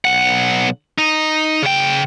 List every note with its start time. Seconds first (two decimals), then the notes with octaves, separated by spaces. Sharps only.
0.05 B1 F#5
0.98 D#4
1.63 C#3 G5